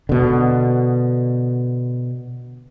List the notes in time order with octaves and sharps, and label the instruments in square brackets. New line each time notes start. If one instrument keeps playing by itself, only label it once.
[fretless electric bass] B2 D3